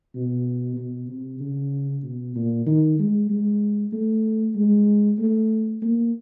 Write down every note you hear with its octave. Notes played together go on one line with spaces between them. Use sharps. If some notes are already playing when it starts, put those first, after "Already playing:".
B2
B2
C3
C#3
B2
A#2
D#3
G#3
G#3
A3
G#3
A3
A#3